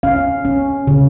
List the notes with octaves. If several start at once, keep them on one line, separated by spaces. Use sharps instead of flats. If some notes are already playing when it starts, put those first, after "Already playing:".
C#4 F5
C#4
C#3